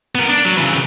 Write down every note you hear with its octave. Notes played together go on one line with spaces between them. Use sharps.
B3 A#4
D4
F#3
C#3 E3